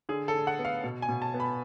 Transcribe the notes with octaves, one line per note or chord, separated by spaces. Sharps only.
D3 G#4
A4
D3
F#5
B3
F5
B2
G#5
B2
A5
B3
B5